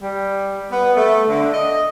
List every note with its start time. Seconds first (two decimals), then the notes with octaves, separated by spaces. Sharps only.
0.02 G3
0.71 B3
0.97 A3
1.28 D3
1.54 D#5